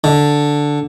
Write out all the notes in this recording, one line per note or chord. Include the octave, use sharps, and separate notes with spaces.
D3